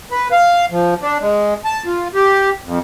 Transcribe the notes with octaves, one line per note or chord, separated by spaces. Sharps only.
B4
F5
F3
D4
G#3
A5
F4
G4
F2